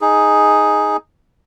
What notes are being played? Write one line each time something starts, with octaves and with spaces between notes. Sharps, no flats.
D#4 G#4